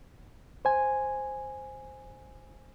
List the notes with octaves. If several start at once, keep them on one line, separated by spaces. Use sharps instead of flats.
C5 G#5